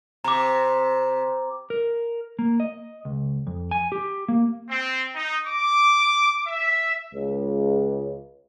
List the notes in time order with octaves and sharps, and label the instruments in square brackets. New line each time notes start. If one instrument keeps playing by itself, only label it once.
[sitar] C3 [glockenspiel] A#5 D6
[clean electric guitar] A#4
A#3
D#5
C#2
F2
G#5
G4
A#3
[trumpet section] C4
D#4
D6
E5
[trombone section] C#2